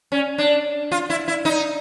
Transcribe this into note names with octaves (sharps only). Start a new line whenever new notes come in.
C#4
D4
F4
E4
E4
D#4